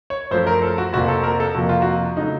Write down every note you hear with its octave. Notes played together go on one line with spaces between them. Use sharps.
C#5
F#2 F3 A3 C5
A#4
A4
F#4
F2 C3 F3 A#3 F#4
A4
A#4
A4
F2 C3 F3 A#3 F#4
F4
F#4
C#3 F#3 A3 D#4